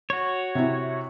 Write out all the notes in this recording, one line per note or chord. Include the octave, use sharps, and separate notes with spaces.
F#4 C#5
C3 E4